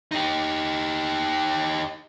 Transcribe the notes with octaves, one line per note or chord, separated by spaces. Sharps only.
D#4 G4